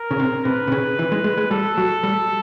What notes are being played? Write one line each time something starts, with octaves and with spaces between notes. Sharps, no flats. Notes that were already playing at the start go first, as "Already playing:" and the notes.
Already playing: A#4
C#3
C3
C3 B4
C3
C#3
E3
G#3
G#3
G#3
G3 A4
F#3
G3